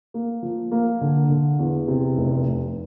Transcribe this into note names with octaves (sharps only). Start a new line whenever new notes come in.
A#3
F3
A#3
D3
D3
E2
C3
F1
F1